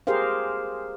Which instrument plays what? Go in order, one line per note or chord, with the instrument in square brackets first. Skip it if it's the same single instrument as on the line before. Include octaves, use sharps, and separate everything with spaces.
[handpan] G4 G#4 A#4 C5 F5